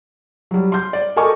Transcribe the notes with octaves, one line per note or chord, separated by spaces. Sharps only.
F#3 G3
C6 G6
D5
A4 A#4 D#5 G#5 C#6 D6